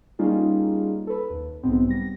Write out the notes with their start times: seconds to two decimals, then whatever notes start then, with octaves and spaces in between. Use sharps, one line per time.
0.19 G3 A#3 C#4 D#4 F4 G#4
1.07 A4 B4
1.30 D#2
1.63 B1 G#2 B3 C4
1.88 G3 A#6